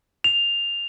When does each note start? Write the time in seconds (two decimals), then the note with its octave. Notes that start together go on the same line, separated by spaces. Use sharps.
0.24 F7